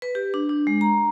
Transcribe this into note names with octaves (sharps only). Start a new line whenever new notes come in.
B4
G4
D4
D4
G#3
A#5